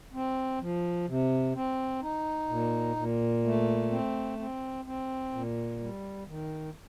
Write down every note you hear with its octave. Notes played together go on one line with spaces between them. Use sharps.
C4
F3
C3
C4
D#4
A#2
A#2
A3
C4
C4
C4
A#2
G3
D#3